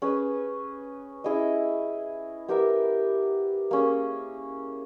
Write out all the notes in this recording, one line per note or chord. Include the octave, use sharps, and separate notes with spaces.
C#4 G#4 B4
C#4 E4 G#4 D#5
B3 G4 A#4 E5
A#3 C#4 G#4